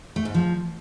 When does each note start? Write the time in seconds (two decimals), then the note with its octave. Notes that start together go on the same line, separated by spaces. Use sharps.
0.16 A3
0.25 G#2
0.34 F3